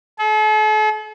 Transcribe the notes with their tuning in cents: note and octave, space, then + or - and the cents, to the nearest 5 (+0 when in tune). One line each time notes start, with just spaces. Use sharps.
A4 -45